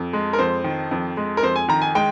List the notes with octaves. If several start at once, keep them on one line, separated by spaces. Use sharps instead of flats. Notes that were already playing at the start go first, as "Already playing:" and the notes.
Already playing: F2
G#3
A#4
F2 C5
D#3
F2
G#3
A#4
F2 C5
G#5
D#3 A#5
G#5
G#3 G5